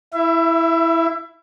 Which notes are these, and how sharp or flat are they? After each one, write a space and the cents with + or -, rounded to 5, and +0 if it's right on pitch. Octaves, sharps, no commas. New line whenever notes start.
E4 +0 E5 +30